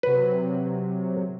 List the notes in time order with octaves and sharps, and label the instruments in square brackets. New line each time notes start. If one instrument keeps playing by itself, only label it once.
[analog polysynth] C3 F#3 [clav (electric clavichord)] B4